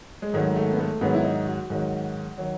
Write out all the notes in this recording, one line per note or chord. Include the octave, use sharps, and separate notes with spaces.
G#3
G#2 D#3 F#3 A3
A3
B3
A3
G#2 D#3 F#3 B3
E4
D#4
F#4
G#2 D#3 F#3
D#3 F#3